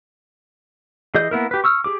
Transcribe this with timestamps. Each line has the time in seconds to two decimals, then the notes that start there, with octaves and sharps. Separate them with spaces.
1.15 E3 G#4 D#5 G6
1.31 A#3 B3 E4 A#4
1.51 G4 B4
1.64 C#6 E6 F6
1.84 G4 G#4 D6